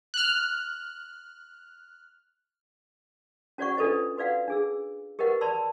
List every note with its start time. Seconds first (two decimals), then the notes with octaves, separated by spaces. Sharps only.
0.14 F6 F#6
3.58 C#4 F#4 C5 D5 F#5 C#6
3.77 D4 F4 A4 B4 C5 D#5
4.17 F#4 B4 D5 F5 F#5
4.48 D4 G#4 E6
5.19 G4 A#4 B4 D#5 F#5
5.41 D5 A5 B5 C6 E6